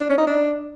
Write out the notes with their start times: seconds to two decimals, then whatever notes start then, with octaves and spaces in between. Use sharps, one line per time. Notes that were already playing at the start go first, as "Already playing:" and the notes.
0.01 D4
0.09 C#4
0.18 D#4
0.27 D4